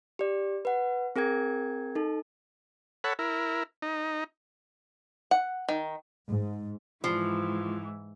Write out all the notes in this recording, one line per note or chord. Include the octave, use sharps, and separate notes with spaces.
G4 D5
B4 F#5
C4 G#4 A#4 G5 G#6
D#4 A4
A4 C#5 F#5 B5
E4 A#4
D#4
F#5
D#3
G#2
G#2 E3 F3